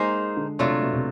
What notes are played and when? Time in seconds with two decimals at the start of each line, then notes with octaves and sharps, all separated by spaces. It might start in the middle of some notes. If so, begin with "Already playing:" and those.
Already playing: G#3 A#3 D#4 G#4 C5
0.37 D3
0.59 C3 F#3 A3 D4 F4
0.82 B2
0.93 C3